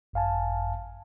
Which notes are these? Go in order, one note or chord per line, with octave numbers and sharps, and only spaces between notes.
G#1 F#2 F5 G#5 A5